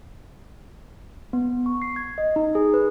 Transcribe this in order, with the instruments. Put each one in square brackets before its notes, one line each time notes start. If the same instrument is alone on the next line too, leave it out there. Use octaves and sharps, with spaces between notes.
[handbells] B3
C#6
C7
G#6
D#5
D#4
G#4
B4